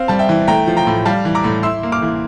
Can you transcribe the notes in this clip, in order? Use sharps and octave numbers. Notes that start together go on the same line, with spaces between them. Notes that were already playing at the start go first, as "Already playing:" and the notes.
Already playing: C4 F5
G3 A5
E5 G5
E3
A3 G5 A#5
F3
G5 A#5
A2
G3 F5 A5
E3
A#5 D6
A2
E4 C6 E6
A#3
D6 F6
E3